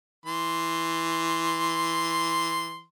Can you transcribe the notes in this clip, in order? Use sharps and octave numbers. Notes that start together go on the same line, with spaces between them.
E3 C6